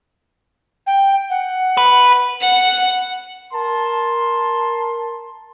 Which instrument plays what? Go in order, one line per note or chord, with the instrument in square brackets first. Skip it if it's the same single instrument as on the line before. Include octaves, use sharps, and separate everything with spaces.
[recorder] G5
F#5
[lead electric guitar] B4
[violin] F#5
[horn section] A#4 A5 C6